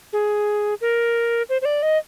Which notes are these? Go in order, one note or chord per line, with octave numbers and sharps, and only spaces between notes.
G#4
A#4
C5
C5
D5
D#5